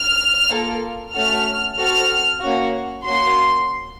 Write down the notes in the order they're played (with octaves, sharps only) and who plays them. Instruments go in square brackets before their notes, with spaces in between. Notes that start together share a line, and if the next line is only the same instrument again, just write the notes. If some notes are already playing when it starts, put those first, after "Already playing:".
Already playing: [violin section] F6
A#3 F4 A4
A3 C#4 F#4 A4 F6
C4 F#4 A4 F6
A#3 C#4 F#4
A#3 C#4 F#4 C6